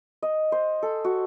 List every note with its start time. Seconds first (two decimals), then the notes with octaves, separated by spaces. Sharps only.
0.23 D#5
0.52 C5
0.83 A4
1.04 F#4